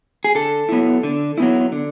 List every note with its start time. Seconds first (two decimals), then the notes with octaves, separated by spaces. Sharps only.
0.24 G#4
0.35 D3 A4
0.69 F#3 B3 E4
1.03 D3
1.38 F#3 B3 E4
1.72 D3